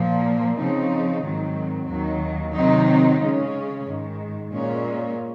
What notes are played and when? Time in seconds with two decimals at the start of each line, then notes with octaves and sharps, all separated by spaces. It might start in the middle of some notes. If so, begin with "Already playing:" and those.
Already playing: A#2 F3 A#3
0.57 C#3 F3 C4 D#4
1.23 G#2 D#3 F#3 C4
1.88 D#2 D#3 F#3
2.54 C3 D#3 F#3 C4 D#4
3.19 C#3 G#3 C#4
3.84 G#2 D#3 G#3
4.49 A#2 G#3 C#4